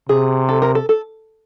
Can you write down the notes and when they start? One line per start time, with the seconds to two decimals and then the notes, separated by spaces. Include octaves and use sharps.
0.09 C3 G#4
0.49 A4
0.62 A#4
0.75 A4
0.89 A4